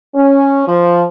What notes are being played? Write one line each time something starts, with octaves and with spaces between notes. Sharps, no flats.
C#4
F3